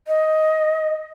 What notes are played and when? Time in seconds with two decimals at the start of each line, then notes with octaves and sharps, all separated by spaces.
0.08 D#5